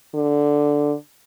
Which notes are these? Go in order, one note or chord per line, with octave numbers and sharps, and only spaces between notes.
D3